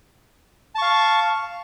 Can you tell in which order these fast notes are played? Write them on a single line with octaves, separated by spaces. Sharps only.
A5 C#6 F5